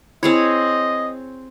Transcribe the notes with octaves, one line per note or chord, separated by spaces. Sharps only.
C4 E4 G#4 C#5 D#5